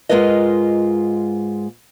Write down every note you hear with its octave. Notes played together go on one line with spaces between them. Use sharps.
G#2 G#3 F4 A#4 B4 D#5